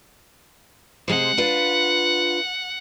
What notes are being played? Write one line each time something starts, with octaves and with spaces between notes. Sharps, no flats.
C3 G#3 C5 F#5
D4 F4 B4